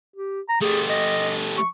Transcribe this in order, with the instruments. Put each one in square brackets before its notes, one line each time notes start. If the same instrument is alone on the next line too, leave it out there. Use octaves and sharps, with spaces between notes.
[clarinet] G4
A#5
[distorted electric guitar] A3 G4 [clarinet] G#4
[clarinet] D#5
C#6